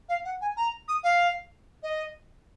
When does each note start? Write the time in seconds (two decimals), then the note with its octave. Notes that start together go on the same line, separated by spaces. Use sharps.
0.08 F5
0.24 F#5
0.41 G#5
0.57 A#5
0.88 D#6
1.03 F5
1.82 D#5